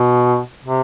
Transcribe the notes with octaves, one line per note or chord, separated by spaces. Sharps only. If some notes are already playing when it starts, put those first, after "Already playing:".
Already playing: B2
C3